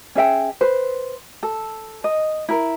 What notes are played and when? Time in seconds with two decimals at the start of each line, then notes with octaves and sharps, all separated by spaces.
0.15 C#4 G#4 E5 G5
0.61 B4 C5
1.43 A4
2.04 D#5
2.49 E4 A#4